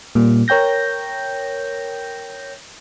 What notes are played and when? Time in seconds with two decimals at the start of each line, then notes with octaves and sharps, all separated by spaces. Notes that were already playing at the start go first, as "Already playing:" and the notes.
0.15 A#2 G3 A#3
0.48 A#4 C#5 G5 G6 A#6